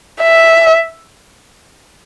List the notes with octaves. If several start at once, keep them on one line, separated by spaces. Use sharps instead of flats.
E5